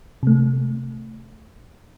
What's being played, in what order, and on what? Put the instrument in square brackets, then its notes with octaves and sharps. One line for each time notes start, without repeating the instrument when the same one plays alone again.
[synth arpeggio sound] C3 A3